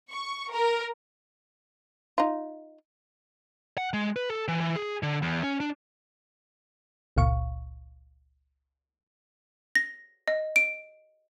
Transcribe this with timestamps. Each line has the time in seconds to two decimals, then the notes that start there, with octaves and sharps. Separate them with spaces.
0.10 C#6
0.52 A#4
2.18 D#4 F4
3.78 F#5
3.93 G#3
4.16 B4
4.30 A4
4.48 E3
4.60 E3
4.76 G#4
5.03 D3
5.22 E2
5.44 C#4
5.60 D4
7.16 G1 C#2 A#2 F5 C#6
9.75 A#6
10.28 D#5
10.56 D7